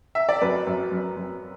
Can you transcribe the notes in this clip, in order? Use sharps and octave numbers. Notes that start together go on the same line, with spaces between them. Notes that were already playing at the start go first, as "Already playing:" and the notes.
E5
D5
F#2 B4
F#2
F#2
F#2